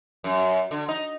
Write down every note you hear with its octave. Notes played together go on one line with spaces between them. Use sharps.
F#2
D3
D#4